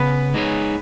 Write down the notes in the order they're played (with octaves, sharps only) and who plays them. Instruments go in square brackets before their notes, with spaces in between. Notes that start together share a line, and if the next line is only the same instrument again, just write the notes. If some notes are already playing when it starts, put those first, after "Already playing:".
Already playing: [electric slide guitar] C#3 [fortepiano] B3 B4
[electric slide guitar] G#3 D#4 G#4 C#5